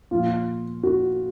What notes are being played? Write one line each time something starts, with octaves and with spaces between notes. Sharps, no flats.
A#2 F3 F4
F#4